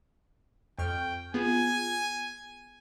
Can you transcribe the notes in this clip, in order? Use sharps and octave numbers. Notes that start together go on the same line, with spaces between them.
F2 G5 C#6 F6
B3 F4 G#4 G#5